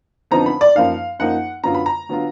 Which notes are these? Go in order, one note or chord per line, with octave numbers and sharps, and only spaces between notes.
F2 D3 F3 B3 D#4 A#5
B5
D5
F#2 F3 A#3 D#4 F5
F#2 F3 A#3 D#4 F#5
F#2 D3 F#3 B3 F4 A#5
B5
A#5
D3 F#3 B3 F4